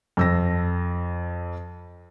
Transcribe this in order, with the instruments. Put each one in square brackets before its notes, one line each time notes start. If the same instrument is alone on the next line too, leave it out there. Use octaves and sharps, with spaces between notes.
[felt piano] F2 E6 A#6